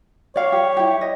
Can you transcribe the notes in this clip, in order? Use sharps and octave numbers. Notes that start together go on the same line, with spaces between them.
C#5 D5 F5
G4
E4 G4
D#5